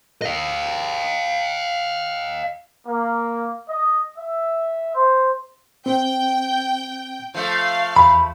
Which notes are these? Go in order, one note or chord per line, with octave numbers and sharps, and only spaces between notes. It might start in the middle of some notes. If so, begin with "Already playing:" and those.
D#5 F5
A#3
D#5
E5
C5
C4 G5
F3 A3 F5
E2 B5